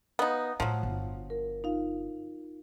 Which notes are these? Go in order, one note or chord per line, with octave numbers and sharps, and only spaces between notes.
B3 D#4 F5 A#5 D#6
A2 F3 F#3
G1
A#4
D#4 F4 F5